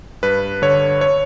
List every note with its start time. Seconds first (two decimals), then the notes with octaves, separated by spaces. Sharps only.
0.23 G2 B4
0.62 D3 C#5
1.01 C#5